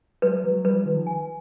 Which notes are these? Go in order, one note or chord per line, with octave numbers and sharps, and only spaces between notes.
F#3 G#3 B4
F#3 G#3
F3 G3 B4
D#3 F3
G#5